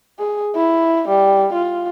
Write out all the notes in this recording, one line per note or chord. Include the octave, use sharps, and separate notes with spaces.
G#4
E4
G3
F4